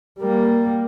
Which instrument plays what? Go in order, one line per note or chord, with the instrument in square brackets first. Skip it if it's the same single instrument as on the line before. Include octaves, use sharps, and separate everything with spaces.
[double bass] G3 A#3